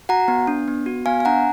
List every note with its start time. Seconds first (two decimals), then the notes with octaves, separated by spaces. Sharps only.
0.09 F#4 F#5 A#5
0.28 B3
0.47 D4
0.68 B3
0.86 F#4
1.06 B3 F5 G#5
1.20 G#5
1.25 D4 F#5 A#5